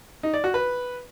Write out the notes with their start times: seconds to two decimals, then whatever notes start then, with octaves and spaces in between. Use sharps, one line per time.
0.23 D#4
0.34 D5
0.44 F#4
0.54 B4